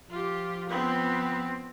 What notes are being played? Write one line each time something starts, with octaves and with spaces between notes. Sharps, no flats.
F3 F4 G4
B3 C4 B4